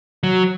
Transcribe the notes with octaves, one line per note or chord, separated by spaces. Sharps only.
F#3